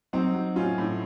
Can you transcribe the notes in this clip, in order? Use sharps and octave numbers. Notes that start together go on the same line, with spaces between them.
F#3 C4 D#4
F#3
A2 C#4 F4
A2